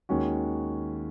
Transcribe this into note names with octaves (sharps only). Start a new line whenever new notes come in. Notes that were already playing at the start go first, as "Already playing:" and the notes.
D#2 D#3 G#3 C#4 F#4